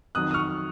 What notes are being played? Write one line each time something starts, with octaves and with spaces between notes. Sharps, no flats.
F2 D#3 F#3 D#6 F#6
D#6
C#6 F6